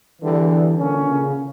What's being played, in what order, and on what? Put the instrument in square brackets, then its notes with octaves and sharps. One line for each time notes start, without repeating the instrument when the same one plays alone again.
[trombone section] E2 D3 G3 [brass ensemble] E3
[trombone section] A#2 A#3 C#4 [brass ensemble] D3
[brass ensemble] C#3